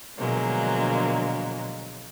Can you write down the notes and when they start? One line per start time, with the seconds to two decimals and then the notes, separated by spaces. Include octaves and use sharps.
0.18 B2 D3 F3 F#3 G#3 A#3